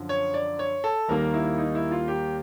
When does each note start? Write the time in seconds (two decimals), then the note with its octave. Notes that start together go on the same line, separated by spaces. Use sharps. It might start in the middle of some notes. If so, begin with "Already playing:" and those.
Already playing: F#2 D3 F3
0.09 C#5
0.34 D5
0.59 C#5
0.84 A4
1.08 D#2 D#3 G3 A#3 A#4
1.34 E4
1.58 D#4
1.75 E4
1.92 F4
2.08 G4